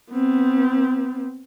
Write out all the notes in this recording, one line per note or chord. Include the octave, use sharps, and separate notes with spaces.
B3 C4